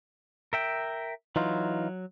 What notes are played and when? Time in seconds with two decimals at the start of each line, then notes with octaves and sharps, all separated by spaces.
0.53 A#4 E5 G5
1.36 E3 F#3 D#4 F4